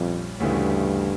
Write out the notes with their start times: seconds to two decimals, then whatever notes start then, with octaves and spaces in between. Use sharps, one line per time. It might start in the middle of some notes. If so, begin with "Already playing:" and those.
Already playing: A#1 F2 A#2 G3 C#4 E4
0.40 D2 G2 C#3 E3 A3